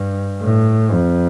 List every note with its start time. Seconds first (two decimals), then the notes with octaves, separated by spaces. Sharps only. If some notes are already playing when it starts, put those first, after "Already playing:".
Already playing: G2
0.41 A2
0.92 F2